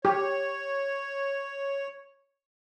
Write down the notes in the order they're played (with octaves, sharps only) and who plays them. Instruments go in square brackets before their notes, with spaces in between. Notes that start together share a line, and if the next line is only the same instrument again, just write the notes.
[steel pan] G4 [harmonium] C#5